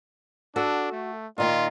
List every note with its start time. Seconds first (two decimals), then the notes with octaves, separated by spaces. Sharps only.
0.56 D4 F#4 A4
0.92 A3
1.38 A#2 D#3 A#3 F4